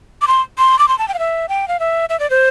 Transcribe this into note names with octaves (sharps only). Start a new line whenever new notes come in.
D6
C6
C6
D6
C6
A5
G5
F5
E5
G5
F5
E5
E5
D5
C5